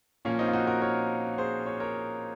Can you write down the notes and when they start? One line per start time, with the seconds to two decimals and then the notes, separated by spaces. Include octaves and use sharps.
0.25 A#2 F3 A#3 C#4
0.39 C4 D#4
0.47 F4
0.53 D#4 F#4
0.67 F#4 A#4
0.82 A#4 C#5
1.38 G#4 C5
1.66 C#5
1.80 A#4 C#5